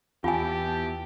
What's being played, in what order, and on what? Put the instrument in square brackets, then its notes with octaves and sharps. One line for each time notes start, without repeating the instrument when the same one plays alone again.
[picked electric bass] E2 [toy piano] F4 G#5 [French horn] G4 [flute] A5